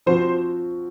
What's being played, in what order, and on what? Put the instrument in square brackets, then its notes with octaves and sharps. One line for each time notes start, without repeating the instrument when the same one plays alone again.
[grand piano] F3 C4 F#4 [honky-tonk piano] C5